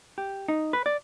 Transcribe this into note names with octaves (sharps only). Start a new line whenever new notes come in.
G4
D#4
B4
D5